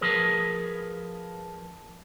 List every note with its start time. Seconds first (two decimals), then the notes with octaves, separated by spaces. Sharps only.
0.01 F3 G#4 A#4 B4